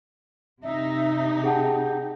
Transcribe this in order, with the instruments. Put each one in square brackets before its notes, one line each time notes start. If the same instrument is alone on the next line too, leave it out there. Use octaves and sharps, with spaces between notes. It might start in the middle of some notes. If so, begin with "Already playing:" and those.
[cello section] C3 D#4 [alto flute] E5
[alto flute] G4 [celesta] G#4 F#5 A5